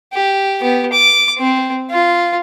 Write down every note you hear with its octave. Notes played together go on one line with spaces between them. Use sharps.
G4
B3 G4
D6
C4
F4